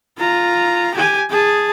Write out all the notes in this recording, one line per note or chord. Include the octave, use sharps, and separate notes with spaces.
F4 A#5
G4 G#5
G#4 A5